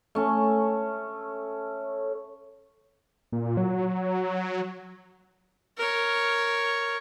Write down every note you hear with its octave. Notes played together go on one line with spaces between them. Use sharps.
A3 C#4
A#2
F#3
A#4 C#5